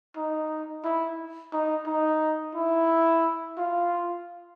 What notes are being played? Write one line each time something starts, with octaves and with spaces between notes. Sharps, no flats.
D#4
E4
D#4
D#4
E4
F4